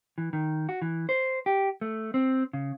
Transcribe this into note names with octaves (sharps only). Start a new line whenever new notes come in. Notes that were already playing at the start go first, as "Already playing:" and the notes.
E3
D#3
F#4
E3
C5
G4
A3
C4
C#3